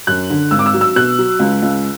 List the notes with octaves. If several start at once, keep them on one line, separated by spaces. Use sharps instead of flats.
F#2 F#6
D3
G#1 E6
D6
E6
F#3
E6
B2 F#6
F#3
C#2
C#2